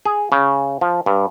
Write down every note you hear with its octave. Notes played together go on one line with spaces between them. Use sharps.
G#4
C#3
F3
G2